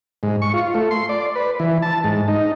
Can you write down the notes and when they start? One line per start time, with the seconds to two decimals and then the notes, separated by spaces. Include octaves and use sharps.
0.23 G#2
0.42 C#6
0.54 F4
0.75 A3
0.91 C6
1.09 D5
1.36 B4
1.60 E3
1.82 A5
2.04 G#2
2.28 D#4